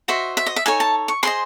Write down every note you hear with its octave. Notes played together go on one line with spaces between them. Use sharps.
F#4 C5 D#5 E5
E5
D#5
E5
D#4 A4 C#5 G#5
A5
C#6
G#4 C5 D#5 C6